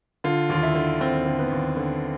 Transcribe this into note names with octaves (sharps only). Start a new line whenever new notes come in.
D3 F4
D#2 F4
E4
D3
D#2 C4
D3
B3
D#2
D3